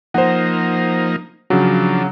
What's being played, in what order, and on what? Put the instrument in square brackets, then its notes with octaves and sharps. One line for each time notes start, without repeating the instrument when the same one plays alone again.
[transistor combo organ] F3 A#3 D#4 [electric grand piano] C5 F#5
[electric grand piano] C#3 F#3 [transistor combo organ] F3 D4